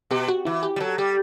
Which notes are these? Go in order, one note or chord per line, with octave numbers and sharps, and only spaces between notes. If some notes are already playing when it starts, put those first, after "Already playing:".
B2 G4
F#4
E3 E4
G4
G3
F#3 A4
G3 G4